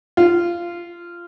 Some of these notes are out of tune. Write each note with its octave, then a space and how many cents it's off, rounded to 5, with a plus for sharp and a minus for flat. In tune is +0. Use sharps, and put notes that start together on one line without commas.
F4 -15